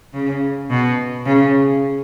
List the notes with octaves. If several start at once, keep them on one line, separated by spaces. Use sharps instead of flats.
C#3
B2
C#3